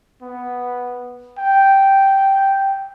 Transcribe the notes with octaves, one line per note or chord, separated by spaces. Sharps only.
B3
G5